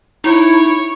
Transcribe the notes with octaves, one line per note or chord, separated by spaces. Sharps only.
D#4 E4 C#5